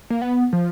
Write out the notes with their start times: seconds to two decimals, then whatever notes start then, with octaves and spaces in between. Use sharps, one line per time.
0.10 A#3
0.22 B3
0.53 F3